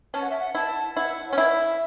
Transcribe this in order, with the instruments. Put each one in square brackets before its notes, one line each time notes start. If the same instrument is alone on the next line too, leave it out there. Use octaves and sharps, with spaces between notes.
[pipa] C#4 [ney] A5
[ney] F#5
E5
F#5
[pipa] E4 [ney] A5
[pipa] E4 [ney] F#5
[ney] C#5
[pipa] C#4
[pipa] E4 [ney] E5